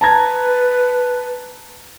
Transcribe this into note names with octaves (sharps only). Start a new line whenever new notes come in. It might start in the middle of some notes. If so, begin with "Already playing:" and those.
B4 A5 A#5 G#6